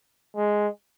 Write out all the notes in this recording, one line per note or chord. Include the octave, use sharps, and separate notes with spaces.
G#3